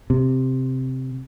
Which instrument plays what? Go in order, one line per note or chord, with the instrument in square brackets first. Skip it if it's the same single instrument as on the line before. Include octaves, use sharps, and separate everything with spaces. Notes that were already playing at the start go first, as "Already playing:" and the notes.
[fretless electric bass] C3